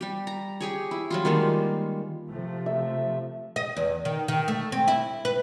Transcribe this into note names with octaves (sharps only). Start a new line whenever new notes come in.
G3 G4
A#5
G4 G#4 C#5
E4
F#3 G3 F4
D#3 G3 G#3 A#3
C3 F3 A3
E5
D#5
E2
D#3
D#3
A3
C4
E4
B4